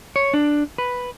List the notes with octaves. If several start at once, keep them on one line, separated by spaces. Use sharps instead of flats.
C#5
D4
B4